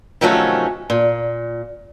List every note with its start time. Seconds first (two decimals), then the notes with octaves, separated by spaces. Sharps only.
0.21 C3 D#3 F3 F#3 A3 C#4
0.90 A#2